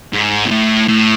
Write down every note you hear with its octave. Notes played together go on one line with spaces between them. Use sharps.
G#2
B2
A2
A2